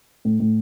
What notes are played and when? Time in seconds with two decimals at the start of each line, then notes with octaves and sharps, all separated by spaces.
0.25 A2
0.40 A2